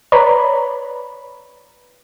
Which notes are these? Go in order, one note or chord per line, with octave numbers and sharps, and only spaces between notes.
B4 C#5 D5 A#5 B5